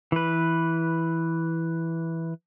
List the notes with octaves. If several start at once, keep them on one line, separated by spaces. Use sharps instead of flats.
E3 B4